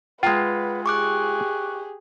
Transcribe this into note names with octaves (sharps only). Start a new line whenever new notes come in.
G#3 F4 B4 F#5 G5 A#5 B5
G4 G#4 C#6 D6 F#6